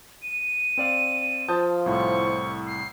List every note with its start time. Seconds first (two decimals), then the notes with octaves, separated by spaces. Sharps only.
0.22 D#7
0.78 C4 D5 F5
1.48 F3 A5 D#6 G6
1.86 C2 A2 C#6
2.67 C7